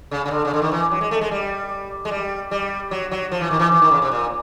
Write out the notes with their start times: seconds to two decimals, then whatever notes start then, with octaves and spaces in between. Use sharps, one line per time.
0.11 C#3
0.26 C#3
0.31 D3
0.45 C#3
0.54 D3
0.62 D#3
0.72 E3
0.91 F#3
1.01 G#3
1.11 A3
1.21 G#3
1.31 G3
2.05 G#3
2.11 G3
2.51 G3
2.91 F#3
3.11 F#3
3.32 F3
3.41 E3
3.51 D#3
3.59 E3
3.72 E3
3.82 D#3
3.91 C#3
4.02 C3
4.12 A#2